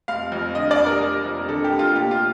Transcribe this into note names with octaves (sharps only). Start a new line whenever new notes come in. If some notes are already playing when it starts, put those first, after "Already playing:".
F1 F5
F2
D3 D#5
D5
F1
A#4
F1
F2
D3 A4
G4
F1
F4
A#2 G4
F4